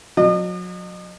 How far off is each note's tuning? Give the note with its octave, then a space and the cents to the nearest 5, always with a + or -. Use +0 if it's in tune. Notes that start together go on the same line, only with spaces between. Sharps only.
F#3 -35 D#5 -35 D#6 -40